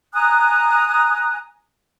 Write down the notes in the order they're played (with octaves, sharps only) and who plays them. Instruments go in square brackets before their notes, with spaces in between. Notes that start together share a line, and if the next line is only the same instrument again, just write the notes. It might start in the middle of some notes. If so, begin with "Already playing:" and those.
[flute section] G#5 A#5 D#6 F#6